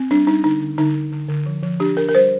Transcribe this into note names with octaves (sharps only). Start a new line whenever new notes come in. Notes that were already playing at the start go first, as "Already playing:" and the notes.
Already playing: C4
G3 D4
G3 D#4
D3 D#4
D3
D3 D#4
D3
D3
D3
F3
F3
D4 G4
D4 A#4
A#4
G3 C5